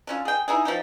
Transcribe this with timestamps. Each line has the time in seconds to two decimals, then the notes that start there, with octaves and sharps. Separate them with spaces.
0.07 D3 C#4 F4
0.25 G#4 G5
0.48 D#4 E4 G#4
0.65 F3 D#4 G4